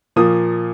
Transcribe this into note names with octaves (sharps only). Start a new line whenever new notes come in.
A#2 F3 A#3 D#6